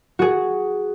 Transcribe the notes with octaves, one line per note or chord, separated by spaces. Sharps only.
F#4 G#4